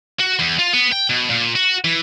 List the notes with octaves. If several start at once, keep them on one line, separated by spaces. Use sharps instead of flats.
F#4
E2
F4
B3
G5
B2
A#2
F#4
E3